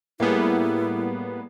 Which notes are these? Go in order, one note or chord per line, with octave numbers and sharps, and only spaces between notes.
A2 G3 A#3 B3 E4 G4 G#4